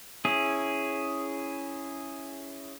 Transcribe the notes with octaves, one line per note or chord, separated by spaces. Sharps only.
C#4 E4 G#4